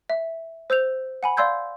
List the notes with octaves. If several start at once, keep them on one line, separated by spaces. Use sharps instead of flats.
E5
C5 E6 G6 F7
F#5 G#5 B5
D5 F5 C6 E6 G6 G#6